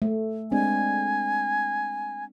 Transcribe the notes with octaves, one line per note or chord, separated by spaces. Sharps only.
A3
G#3 C4 D4 G#5